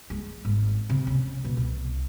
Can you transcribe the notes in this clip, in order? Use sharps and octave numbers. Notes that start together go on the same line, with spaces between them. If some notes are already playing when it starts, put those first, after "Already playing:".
G#3
G#1
C3
C#4
B2
C2